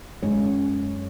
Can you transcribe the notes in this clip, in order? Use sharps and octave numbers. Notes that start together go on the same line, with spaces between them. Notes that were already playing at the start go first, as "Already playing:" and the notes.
F#2 G#3 C#4 G#4 C#5